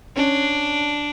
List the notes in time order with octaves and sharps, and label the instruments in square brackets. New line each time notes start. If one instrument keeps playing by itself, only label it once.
[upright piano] C#4 [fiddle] D4